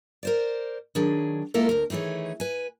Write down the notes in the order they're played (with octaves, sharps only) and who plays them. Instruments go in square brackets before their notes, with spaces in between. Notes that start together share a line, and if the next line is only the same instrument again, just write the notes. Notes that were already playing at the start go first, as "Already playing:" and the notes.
[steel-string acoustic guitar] A#4 C5 D5
D#3 F#3 D4 G#4
G#3 A#3 E4 F4 A4 A#4
D2 A#4
D#3 E3 A3 G#4 C#5
B4 G#5